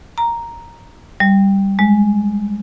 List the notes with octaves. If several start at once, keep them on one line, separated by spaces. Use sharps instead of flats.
A#5
G3
G#3